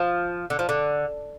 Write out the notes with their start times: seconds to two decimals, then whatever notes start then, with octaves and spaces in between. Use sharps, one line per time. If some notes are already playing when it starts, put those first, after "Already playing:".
Already playing: F3
0.50 D3
0.59 F3
0.69 D3